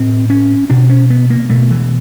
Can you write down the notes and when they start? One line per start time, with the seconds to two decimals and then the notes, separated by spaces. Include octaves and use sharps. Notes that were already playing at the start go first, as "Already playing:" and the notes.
Already playing: A2 C4
0.30 C#4
0.70 B2 D4
0.90 C#4
1.10 B3
1.30 A#3
1.50 B2 A3
1.71 E3